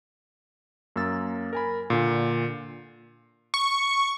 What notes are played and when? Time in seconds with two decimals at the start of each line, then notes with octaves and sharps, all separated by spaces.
0.96 F#2 A#3 E6 A6
1.53 A#4 G#5 B5
1.90 A#2 D3
3.54 C#6